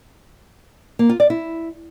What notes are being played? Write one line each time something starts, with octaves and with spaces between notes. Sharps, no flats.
A#3
F4
D5
E4